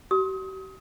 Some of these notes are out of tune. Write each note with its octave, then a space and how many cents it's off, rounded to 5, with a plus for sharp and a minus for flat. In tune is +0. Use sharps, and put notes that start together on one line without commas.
G4 -45 D#6 +30